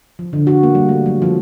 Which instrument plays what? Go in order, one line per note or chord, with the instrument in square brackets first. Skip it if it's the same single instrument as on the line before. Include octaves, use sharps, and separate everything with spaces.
[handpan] F3
D3
F#4
A#3
G3
A3
F#3
F3